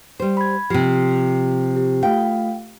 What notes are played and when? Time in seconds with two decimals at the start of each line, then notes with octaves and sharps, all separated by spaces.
0.20 G3 C5
0.37 B5 G#6
0.70 C3 F3 G4 C7
1.77 G4
2.03 A3 F4 F5 G5